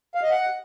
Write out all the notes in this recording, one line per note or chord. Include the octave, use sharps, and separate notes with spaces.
F5
D#5
F#5